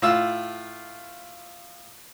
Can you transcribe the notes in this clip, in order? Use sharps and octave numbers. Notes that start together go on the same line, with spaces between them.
A2 F4 E6